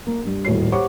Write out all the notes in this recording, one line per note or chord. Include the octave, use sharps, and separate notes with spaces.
A#3
G2
D#1 A2 F#4 C#5 C7
G4 C5 C#5 F#5 C#6 D6